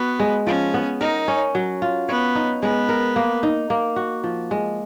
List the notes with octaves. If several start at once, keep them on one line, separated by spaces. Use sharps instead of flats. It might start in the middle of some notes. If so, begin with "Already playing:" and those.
Already playing: B3 F#4
G#3
F3 C#4
B3
D#4 A#4
C#4
F#3
F4
B3 C#5
D#4
G#3 B3
A#4
A#3
D#4
A#3
F#4
F3
G#3